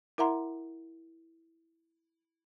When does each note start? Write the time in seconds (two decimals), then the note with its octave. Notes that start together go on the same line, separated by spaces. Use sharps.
0.18 E4 A#4 E5 F#5 A#5 C6